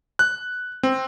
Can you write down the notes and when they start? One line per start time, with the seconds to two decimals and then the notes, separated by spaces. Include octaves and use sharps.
0.19 F#6
0.83 C4